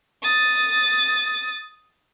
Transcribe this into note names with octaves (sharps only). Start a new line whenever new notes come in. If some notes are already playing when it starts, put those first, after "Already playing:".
D#6 A6